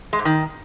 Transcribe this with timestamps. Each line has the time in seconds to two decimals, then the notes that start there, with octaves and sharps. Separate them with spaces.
0.13 G#3
0.19 G#2
0.25 D#3